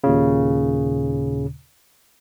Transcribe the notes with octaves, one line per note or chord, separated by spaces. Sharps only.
D#2 A#2 C#3